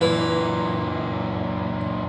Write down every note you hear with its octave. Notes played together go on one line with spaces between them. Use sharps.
F#2 A#2 E3